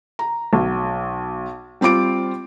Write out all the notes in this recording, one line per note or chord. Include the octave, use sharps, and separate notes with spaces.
A#5
B1
G3 C4 F4 D6 D7